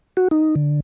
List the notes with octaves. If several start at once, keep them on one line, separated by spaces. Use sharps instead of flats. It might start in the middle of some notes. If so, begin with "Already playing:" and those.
F#4
D#4
D3